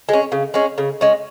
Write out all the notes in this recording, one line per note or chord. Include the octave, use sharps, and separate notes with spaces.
G#3 C#4
C#3
G#3 C#4
C#3
G#3 C#4